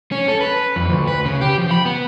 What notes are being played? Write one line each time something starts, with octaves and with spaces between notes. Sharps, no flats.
C#4
A4
B4
F2
D2
B4
C#3
G4
F3
B5
B3